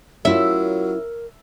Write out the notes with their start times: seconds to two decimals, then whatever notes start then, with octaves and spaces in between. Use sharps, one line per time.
0.25 F#3 C#4 E4 F4 A#4 E5